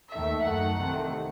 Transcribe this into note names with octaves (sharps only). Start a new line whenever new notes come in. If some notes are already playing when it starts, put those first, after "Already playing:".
D#2 D#3 A3 E5
F#2 D#3 A3 F#5
C2 C3 D#3 A3